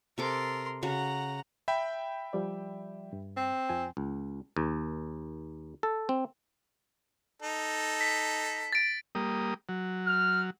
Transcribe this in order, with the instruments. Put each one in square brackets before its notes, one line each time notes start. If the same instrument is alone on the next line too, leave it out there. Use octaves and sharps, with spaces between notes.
[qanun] C3 A4 D6 [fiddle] A#4 C6
[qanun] C#3 F#4 [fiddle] F#5 A#5
[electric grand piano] E5 G5 B5
[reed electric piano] F3 G3 D5
G2
[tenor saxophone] C4
[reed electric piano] F2 F3 G#5
[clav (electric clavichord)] C#2
D#2
A4
C4
[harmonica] D#4 A4
[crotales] B6
A6 D7
[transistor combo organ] G3 A#3 D#6
F#3
[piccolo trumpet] F6